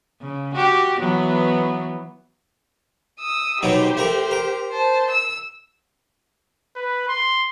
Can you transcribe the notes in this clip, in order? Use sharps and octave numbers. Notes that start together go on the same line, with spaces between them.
C#3
F#4 G4
E3 F#3 B3
D#6 E6
B2 D#3 F#3 G4 C5
A3 A#4
A#4
C5 A5
E6 E7
B4
C6